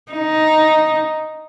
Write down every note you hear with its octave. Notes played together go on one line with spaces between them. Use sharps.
D#4